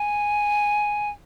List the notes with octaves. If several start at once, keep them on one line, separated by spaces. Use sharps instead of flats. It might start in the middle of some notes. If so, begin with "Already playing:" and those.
Already playing: G#5